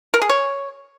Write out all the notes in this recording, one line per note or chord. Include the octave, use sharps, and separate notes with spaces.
A#4
G#4
C#5